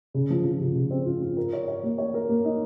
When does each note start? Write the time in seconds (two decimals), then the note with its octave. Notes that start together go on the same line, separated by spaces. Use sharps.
0.14 C#3
0.30 F3
0.45 F3
0.61 C#3
0.75 C#3
0.91 C4
1.06 F4
1.22 F4
1.37 A#4
1.53 C#5
1.68 C#5
1.83 A#3
1.98 C#5
2.14 A#4
2.29 A#3
2.45 D#4